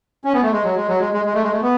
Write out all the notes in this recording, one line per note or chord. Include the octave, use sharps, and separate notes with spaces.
C#4
B3
A3
G#3
F#3
G#3
F#3
G#3
G#3
G#3
A3
G#3
A3
B3